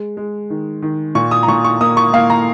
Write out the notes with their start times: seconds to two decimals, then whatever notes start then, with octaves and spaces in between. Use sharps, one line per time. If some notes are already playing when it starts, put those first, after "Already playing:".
Already playing: G#3
0.17 G#3
0.50 D#3
0.82 D#3
1.15 A#2 C#6
1.31 D#6
1.43 A#5
1.48 A#2 C#6
1.65 C#6
1.81 A#3 D#6
1.97 C#6
2.13 A#3 F5
2.30 A#5